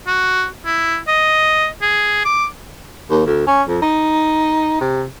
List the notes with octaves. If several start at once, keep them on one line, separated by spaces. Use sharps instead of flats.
F#4
E4
D#5
G#4
D6
D#2
D2
C#4
F2
D#4
C3